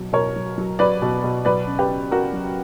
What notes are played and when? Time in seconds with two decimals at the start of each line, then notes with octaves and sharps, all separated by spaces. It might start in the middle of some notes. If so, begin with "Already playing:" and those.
Already playing: B2 F#3
0.13 B2 A#4 C#5
0.36 F#3
0.58 F#3
0.79 F#3 B4 D5
1.02 B2
1.24 B2
1.45 F#3 B4 D5
1.67 C#3
1.79 G4 B4
1.89 C#3
2.11 C#3 F#4 A#4
2.33 F#3